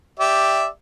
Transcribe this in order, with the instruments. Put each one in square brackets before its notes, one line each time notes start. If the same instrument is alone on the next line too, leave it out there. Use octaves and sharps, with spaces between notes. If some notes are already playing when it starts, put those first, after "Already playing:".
[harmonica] G4 D5 E5